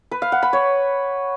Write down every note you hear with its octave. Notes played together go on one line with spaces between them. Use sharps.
B4
F5
F#5
B5
C#5